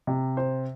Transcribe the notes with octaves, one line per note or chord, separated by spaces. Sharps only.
C3
C5